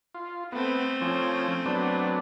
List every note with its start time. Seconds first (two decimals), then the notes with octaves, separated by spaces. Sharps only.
0.14 F4
0.52 A3 B3 C4
1.01 F3 C#4
1.66 F#3 B3 D4